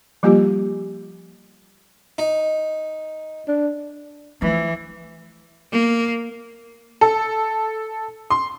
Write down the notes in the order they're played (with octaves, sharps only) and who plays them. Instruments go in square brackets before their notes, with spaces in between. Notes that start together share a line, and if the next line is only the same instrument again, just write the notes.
[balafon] F3 G3 A#3 F4 G4
[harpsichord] D#4
[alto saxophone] D4
[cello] E3 [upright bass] F3 A3
[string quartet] A#3
[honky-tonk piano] A4
C6